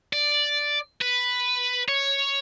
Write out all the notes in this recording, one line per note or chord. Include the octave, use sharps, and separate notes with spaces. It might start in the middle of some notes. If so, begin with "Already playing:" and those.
D5
B4
C#5